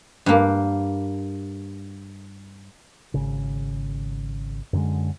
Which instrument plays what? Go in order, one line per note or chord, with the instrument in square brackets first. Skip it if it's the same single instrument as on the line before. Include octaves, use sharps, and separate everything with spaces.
[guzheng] G2 A#3
[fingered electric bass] G#1 C#3
F#2 D3 G#3